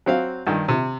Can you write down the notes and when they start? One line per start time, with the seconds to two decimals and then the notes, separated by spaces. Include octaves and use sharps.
0.06 F#3 C4 F5
0.47 G2 D#3
0.68 C3